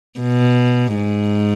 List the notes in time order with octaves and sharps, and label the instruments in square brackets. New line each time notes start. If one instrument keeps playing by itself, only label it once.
[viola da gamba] B2
G#2